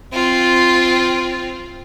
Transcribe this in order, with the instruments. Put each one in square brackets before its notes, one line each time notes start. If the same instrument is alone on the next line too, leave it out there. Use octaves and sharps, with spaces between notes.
[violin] C4 F4